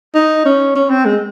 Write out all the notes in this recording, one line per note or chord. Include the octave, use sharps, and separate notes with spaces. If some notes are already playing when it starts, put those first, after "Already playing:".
D#4
C#4
C#4
C4
G#3